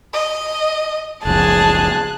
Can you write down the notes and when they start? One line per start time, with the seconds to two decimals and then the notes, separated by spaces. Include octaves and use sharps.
0.13 D#5
1.25 F#1 C#2 F3 G#4 A5 F#6